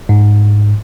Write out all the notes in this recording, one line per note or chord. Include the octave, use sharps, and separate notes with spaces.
G#2